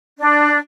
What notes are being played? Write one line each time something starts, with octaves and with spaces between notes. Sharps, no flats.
D4